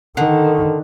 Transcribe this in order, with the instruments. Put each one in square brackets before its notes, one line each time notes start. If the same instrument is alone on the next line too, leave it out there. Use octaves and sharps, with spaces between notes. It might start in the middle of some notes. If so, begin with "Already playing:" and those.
[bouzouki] D3 [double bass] D#3